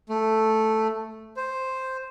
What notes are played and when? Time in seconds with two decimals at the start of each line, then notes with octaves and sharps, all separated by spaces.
0.09 A3
1.37 C5